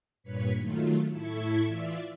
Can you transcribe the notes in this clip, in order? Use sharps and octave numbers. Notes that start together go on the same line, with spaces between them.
G2 A#2 B4 C#5 C#6 B6
D#3 F#3 A3 F4
A2 E4 A4 E5 C#6 G#6
E3 F4 D5 E5 E6